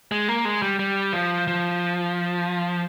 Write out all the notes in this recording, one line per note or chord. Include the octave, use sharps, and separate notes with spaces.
G#3
A#3
G#3
G3
G3
F3
F3